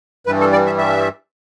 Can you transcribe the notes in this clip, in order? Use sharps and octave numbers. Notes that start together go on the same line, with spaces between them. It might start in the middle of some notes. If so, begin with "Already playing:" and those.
G2 E3 G3 B4
A4
D5
E5
E5